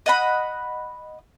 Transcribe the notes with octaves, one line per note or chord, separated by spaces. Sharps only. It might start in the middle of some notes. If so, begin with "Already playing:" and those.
D#5 F#5 B5